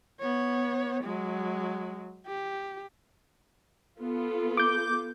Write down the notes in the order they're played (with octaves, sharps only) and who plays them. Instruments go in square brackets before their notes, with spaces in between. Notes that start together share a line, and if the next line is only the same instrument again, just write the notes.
[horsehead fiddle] B3 C#5
F#3 G#3
G4
[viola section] B3 F4 A4
[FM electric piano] D6 G6